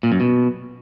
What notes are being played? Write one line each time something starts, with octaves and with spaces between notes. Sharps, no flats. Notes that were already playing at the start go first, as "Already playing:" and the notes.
A#2
F#2
B2